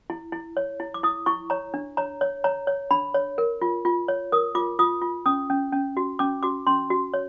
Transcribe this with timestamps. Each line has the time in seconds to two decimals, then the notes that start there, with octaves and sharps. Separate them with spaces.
0.10 E4
0.32 E4
0.57 C#5
0.80 E4
0.94 D6
1.03 E4 D#6
1.26 E4 C#6
1.50 C#5 A#5
1.74 D4
1.97 C#5 A#5
2.21 C#5
2.44 C#5 A#5
2.67 C#5
2.91 D4 B5
3.14 C#5
3.38 A#4
3.62 F4
3.85 F4
4.08 C#5
4.32 A#4 D#6
4.55 F4 D6
4.79 F4 D#6
5.02 F4
5.26 C#4 D#6
5.50 C#4
5.73 C#4
5.97 F#4
6.19 C#4 D6
6.43 F#4 D6
6.67 C#4 C6
6.90 F#4
7.14 C#5